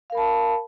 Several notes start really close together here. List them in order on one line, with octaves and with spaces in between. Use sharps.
F5 A#4 B5 A5